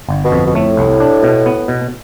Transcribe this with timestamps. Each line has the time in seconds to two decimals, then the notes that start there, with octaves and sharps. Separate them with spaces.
0.09 G1
0.25 B2
0.32 F2
0.46 B2
0.55 A2 A3
0.77 C2
1.00 D4
1.23 B2
1.46 B3
1.68 B2